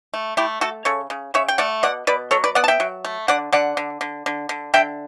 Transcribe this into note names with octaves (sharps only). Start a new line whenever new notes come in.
A3
A3 E4 G4
A3 F#4 A4
C#3 A4 C#5
C#3
C#3 C#5 E5
G5
A3 D5 F#5
B2 D5 F#5
B2 B4 D5
F#3 A4 C#5
B4 D5
B3 D5 F#5
A5
E5 G5
F#3
A3
D3 D5 F#5
D3 D5 F#5
D3
D3
D3
D3
D3 E5 G5